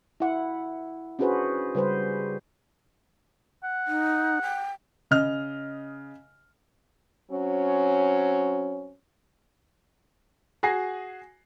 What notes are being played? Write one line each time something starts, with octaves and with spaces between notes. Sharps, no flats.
E4 F#5
C#4 D4 F#4 G#4 B4 C5
C#3 G3 B4 C5
F#5
D#4
G5
C#3 D#5 F6
F#3 C4 C#4
F#4 G#4 G#5 A#6 C7